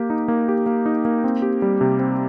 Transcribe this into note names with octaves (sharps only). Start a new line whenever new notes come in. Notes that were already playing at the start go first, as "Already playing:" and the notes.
Already playing: A#3 G4
D#4
A#3
G4
A#3
D#4
A#3
C4
G4
G3
C3
C4